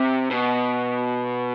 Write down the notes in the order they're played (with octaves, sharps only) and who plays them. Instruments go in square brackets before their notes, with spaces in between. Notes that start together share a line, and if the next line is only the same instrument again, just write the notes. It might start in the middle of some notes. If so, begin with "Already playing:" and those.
Already playing: [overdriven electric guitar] C3
B2